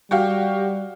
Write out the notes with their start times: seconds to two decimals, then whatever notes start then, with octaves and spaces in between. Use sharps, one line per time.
0.11 G3 F#4 G4 F5